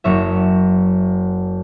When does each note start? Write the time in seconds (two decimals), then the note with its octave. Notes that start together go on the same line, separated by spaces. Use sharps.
0.04 F#1 C#5 E5